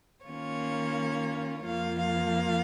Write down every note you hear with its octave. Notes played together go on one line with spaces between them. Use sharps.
D#3 A#3 C#4 F4 C#5
F2 F3 A#3 F4 F5
F5